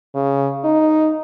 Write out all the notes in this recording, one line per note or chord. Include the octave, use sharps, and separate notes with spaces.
C#3
D#4